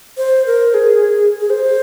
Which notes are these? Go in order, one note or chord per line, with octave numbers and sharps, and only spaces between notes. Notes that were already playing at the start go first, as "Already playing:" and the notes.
C5
A#4
G#4
G#4
C5